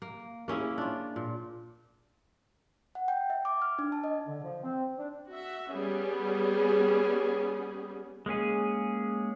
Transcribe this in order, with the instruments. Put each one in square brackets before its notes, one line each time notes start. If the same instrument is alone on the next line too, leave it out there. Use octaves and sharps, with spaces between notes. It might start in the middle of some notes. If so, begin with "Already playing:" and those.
[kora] A#3
A#3 C#4 E4 G#4
D4 F4
A#2
[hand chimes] F#5
G5
E5
D6
F6
D4
A5
D#5
[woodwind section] D3
F3
C4
D4
[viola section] F#4 E5
G3 B3 C#4 G#4
[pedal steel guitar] G#3 A#3 C#4 G#4